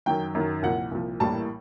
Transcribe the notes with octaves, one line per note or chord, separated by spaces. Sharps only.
F#2 D#3 F#3 G5
F#2 D#3 F#3
C2 A#2 F3 F#5
C2 A#2 F3
A#1 A2 E3 G3 A#3 A5